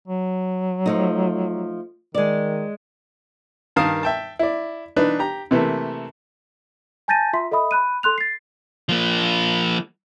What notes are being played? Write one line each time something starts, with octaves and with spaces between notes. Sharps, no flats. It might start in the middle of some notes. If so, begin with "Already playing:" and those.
F#3
F3 A3 D#4
D#3 G#3 D5
G2 D#3 A#4 F5 A5 D#6
E5 G5 A5
E4 D5
E3 D4 D#4 B4
G4 A#5
C3 E3 A3 A#3
G#5 A5 G6 A6 A#6 D#7
F4 E5 C6 B6
A4 D#5 E5 B5 D#6
B5 F#6 D#7
A4 C6 F#6 F7
A6 C7
F3 A#3